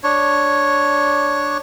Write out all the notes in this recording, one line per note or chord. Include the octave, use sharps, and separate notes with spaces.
D4 C#5